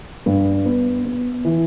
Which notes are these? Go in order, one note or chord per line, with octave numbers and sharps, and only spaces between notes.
G2
B3
B3
E3